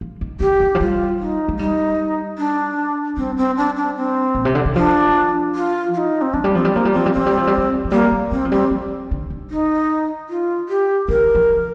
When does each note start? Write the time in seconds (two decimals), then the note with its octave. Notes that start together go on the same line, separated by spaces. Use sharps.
0.01 F3
0.21 D#3
0.40 D3 G4
0.60 D#3
0.75 F3
0.80 G3 F4
1.19 D#4
1.48 G#3
1.59 G3 D#4
2.38 D4
3.17 G3 C4
3.37 C4
3.57 D4
3.77 D4
3.96 C4
4.35 A#2
4.45 C3
4.55 D3
4.66 D#3
4.76 F3 D4
5.55 F4
5.94 F4
5.98 D#4
6.22 C4
6.34 F3 D4
6.44 G3
6.54 F3 C4
6.65 G3
6.73 F3 A#3
6.85 G3
6.93 F3 C4
7.06 G3
7.13 F3 C4
7.26 G3
7.37 F3
7.47 G3
7.58 F3
7.85 F3
7.92 G3 A#3
8.12 A#3
8.31 G#3 C4
8.45 F3
8.52 G3 C4
8.71 F3
9.11 D3
9.30 D#3
9.50 D#4
10.29 F4
10.69 G4
11.09 D3 A#4
11.35 F3